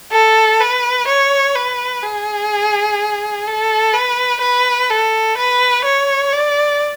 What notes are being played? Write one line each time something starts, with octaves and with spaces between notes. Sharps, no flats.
A4
B4
C#5
B4
G#4
A4
B4
B4
A4
B4
C#5
D5